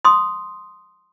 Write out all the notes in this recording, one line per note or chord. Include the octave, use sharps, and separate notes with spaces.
C6 D#6